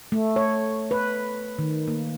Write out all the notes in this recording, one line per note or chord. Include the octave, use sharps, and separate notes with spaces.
A3
C#5
B4
D#3
A#3